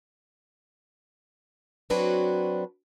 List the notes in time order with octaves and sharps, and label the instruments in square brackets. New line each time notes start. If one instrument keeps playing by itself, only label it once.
[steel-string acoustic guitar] F#3 C4 D4 F#4 B4 C#5